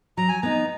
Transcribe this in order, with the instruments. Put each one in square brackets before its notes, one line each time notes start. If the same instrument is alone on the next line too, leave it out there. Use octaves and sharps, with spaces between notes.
[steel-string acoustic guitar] F#3 [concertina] A#5
[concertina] G#5
[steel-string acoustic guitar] B3 D#4 [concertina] A#5